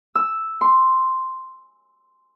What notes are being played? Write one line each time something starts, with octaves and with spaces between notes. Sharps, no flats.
E6
C6